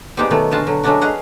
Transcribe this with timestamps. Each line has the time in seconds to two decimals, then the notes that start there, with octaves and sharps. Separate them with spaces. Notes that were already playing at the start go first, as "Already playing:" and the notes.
0.17 G3 G#3 B3 C4 D#4 G4
0.30 B2 D#3 F#3 A3 B3
0.51 D3 G#3 F4 F#4 A5
0.67 D3 F#3
0.83 F#3 G#3 A3 C#4 D4 F#4
1.01 G#4 B4 D#5 F5 F#5